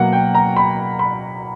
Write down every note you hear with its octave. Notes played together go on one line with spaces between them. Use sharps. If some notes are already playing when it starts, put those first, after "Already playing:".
Already playing: B2 F#3 A#3 F#5
G5
A#5
B5
B5